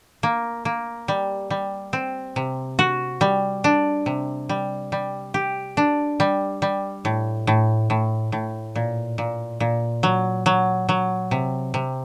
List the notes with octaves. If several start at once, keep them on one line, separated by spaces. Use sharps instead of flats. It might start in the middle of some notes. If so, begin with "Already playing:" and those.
A#3
A#3
G3
G3
C4
C3
F#4
G3
D4
C3
G3
G3
G4
D4
G3
G3
A2
A2
A2
A2
A#2
A#2
A#2
F#3
F#3
F#3
C3
C3